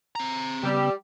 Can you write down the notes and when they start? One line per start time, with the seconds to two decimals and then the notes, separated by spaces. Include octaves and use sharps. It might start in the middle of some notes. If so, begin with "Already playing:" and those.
0.15 C4 A#5
0.63 C#3 G3 B3 G4 E6